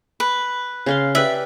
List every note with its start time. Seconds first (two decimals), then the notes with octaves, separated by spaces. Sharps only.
0.20 B4
0.86 C#3 F5 C6
1.15 G4 B4 D5 E5